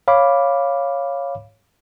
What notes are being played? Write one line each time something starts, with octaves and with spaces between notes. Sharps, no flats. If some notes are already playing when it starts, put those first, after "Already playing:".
C#5 F5 B5 D6